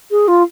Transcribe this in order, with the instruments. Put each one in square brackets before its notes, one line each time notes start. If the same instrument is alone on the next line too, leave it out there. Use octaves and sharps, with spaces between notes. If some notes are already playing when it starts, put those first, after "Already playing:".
[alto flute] G#4
F4